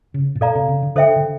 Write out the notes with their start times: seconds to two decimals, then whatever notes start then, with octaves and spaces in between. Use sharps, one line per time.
0.14 C#3
0.35 A#2
0.41 B2 A4 D5 F5 A#5
0.55 C3
0.69 C#3
0.83 D3
0.95 D3 A4 C5 E5 G5
1.16 D3